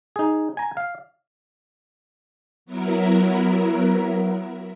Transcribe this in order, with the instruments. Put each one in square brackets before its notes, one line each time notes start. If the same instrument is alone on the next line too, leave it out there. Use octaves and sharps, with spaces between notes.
[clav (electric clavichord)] D#4 G#4
G#5 A#5
F5
[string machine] F#3 B3 E4 A#4